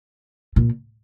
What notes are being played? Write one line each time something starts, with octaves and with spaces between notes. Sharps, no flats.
A#2